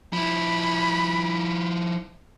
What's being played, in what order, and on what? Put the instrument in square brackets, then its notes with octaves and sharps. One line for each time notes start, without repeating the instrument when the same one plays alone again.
[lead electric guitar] F3 E4 [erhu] B5